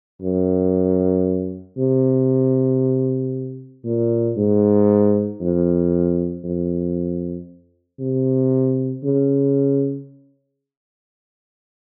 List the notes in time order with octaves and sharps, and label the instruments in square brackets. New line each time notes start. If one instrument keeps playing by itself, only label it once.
[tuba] F#2
C3
A#2
G#2
F2
F2
C3
C#3